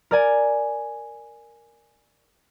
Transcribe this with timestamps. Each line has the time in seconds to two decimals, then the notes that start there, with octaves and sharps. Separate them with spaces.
0.11 A#4 D5 G#5